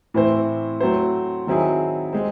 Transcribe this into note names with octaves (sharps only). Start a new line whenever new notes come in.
A2 E3 C4 E4 C5
F#3 A3 C4 E4 C5
D#3 F#3 C4 E4 G#4
G#3 C4